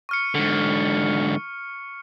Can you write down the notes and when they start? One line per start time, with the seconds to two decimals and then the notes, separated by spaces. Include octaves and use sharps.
0.09 C#6 F6 C#7
0.35 G#2 D3